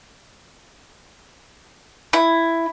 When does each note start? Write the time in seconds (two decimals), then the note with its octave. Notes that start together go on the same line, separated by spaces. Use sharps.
2.13 E4